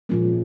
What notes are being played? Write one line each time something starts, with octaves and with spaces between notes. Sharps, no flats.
A#2 F3 G#3 A#3 C#4